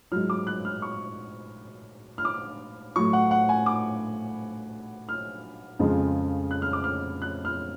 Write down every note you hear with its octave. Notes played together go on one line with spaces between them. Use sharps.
G#2 F#3 F6
D6
F#6
F6
C#6
F6
D6
A2 F#3 C#6
F#5
F#5
G#5
D6
F6
F2 C#3 F3 G#3
F#6
F6
D6
F6
F#6
F6